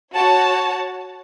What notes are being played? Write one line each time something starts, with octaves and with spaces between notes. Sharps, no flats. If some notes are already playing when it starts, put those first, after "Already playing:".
F#4 C#5 F#5 A5